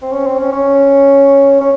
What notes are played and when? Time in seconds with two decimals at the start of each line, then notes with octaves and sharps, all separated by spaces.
0.02 C4
0.12 C#4
0.26 C4
0.38 C#4
0.52 C#4
1.61 C#4